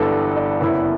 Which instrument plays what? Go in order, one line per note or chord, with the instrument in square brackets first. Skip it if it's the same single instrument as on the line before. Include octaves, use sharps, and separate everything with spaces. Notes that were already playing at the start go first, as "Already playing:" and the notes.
Already playing: [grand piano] G1 G2 E3 G3 D4 [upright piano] A4 B4
[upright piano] D5
[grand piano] F#1 F#2 E3 B3 E4